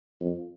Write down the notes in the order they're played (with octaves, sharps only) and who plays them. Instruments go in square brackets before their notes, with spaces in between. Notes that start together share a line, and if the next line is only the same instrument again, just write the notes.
[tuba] F2